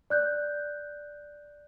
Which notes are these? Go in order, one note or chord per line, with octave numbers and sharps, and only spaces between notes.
D5 F#6 G6